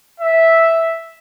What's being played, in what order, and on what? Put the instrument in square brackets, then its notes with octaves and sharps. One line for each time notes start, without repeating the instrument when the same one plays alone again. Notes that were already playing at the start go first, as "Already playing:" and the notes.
[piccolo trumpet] E5